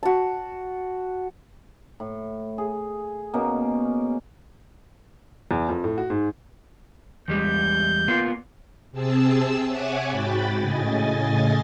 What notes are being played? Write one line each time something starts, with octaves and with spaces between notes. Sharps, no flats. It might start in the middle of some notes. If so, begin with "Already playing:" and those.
F#4 A5
A2
G#4
B2 A#3 C#4
E2
F2
A2
F#4
G#2
E2 G3 G#3 G6
A#3 B3 F4
C3 C4 G#4 A5 E6
C#5 E5 F#5 G#5 D6
G#2 F#4 G5 B5 A6
A2 C#3 D#5 G#5 A6